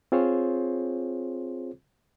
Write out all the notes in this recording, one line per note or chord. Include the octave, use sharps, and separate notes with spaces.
C4 F4 G#4 C5 C#5